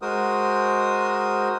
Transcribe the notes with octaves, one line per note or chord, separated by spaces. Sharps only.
G#3 F#4 A#4 C5 D#6